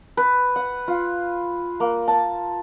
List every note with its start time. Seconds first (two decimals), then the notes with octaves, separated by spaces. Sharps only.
0.17 B4
0.56 F#5
0.88 F4
1.80 A#3
2.08 A5